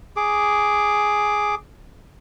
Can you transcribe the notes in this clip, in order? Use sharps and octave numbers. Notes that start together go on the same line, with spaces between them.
G#4 D6